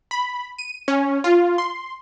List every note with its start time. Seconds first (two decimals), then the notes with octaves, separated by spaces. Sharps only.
0.11 B5
0.59 D#7
0.88 C#4
1.24 F4
1.58 C6